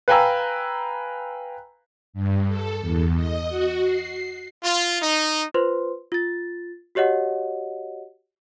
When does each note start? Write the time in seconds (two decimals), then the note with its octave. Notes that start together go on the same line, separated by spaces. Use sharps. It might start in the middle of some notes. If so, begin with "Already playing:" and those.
0.08 B4 F5 G5 G#5 A#5 E6
2.13 G2
2.47 A4
2.80 E2
3.16 D#5
3.48 F#4
3.82 C7
4.64 F4
5.02 D#4
5.54 F4 B4 C5 C6
6.12 F4 A6
6.95 F#4 G4 C#5 D#5 F#5